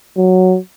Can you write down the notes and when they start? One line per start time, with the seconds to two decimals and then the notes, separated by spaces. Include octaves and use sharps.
0.17 F#3